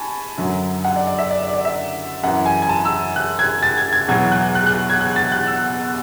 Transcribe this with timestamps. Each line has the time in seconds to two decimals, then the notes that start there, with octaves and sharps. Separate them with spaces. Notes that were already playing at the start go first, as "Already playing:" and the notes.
Already playing: G#5 A5 B5 C#6
0.38 F#2 D3 F#3
0.85 F#5
0.96 D5
1.07 D5
1.19 E5
1.31 D5
1.43 D5
1.53 D5
1.65 E5
2.23 F#2 E3 F#5
2.46 G#5
2.62 G#5
2.69 A5
2.85 E6
3.16 F#6
3.39 G#6
3.63 A6
3.78 G#6
3.93 G#6
4.08 E2 B2 F#3 G#6
4.32 F#6
4.55 F#6
4.66 F#6
4.90 G#6
5.01 F#6
5.16 A6
5.32 F#6
5.47 E6